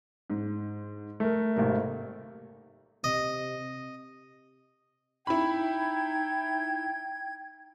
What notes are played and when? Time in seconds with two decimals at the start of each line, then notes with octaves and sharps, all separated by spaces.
0.30 G#2
1.20 A3 A#4
1.56 G#1 C3 A#3
3.04 C3 D#5
5.27 D#4 E4 G5 B5 G#6